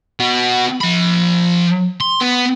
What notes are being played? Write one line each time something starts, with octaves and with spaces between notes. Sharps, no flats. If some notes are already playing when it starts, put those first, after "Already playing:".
B3 F#4
F3 B5
C6
B3